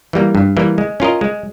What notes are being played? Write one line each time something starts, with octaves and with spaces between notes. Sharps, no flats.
E3 G3 A#3
G2
E3 G3 A#3
G#3
C#4 F4 A#4 D#5
G#3